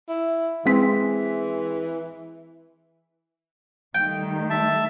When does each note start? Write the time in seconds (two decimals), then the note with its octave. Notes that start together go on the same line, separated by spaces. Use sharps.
0.08 E4
0.65 E3 G#3 C4 B6
3.95 D#3 G3 A3 G5
4.50 E5 A5